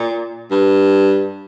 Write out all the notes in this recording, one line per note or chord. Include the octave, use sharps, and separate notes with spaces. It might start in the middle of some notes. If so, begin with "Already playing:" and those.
Already playing: A#2
G2